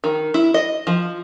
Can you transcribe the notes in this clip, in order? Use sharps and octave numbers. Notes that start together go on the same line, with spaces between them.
D#3
E4
D#5
F3